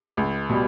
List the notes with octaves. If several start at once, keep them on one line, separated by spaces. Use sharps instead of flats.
C#2
B2 G3